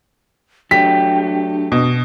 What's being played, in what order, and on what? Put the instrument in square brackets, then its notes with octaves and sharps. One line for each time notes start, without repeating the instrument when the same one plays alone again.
[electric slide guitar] F#3 A3 G4 [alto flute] D4 [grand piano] B6
[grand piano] B2